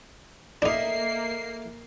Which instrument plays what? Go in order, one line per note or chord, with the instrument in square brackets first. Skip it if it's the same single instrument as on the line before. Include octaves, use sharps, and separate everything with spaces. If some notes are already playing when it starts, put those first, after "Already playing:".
[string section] A#3 C7 [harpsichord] D4 D#4 [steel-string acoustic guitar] A4 D#5 E5